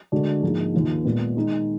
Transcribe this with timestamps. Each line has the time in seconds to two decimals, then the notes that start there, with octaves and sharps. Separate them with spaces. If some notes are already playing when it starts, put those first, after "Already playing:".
0.12 D2 D3 G#3 D4 F#4
0.43 G#2 F3 A#3 D#4 G#4
0.74 D#2 D#3 A#3 F4
1.05 A#2 G#3 B3
1.36 D#3 G#3 D#4